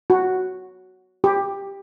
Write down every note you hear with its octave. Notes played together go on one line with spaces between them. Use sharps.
F#4
G4